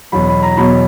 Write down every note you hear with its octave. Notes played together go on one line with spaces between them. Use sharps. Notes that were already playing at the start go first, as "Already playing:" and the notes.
E2 B2 F#3 B5
B5
A#5
E2 B2 F#3 B5